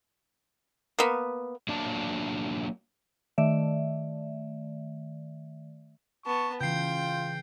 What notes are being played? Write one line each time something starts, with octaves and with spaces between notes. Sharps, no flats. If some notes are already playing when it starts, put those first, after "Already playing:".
A#3 B3
F#3 A#3 D4 F5 A5
D#3 A3 D5 E5
B3 A5 C#6
C#3 E3 F4 G5 G6 C7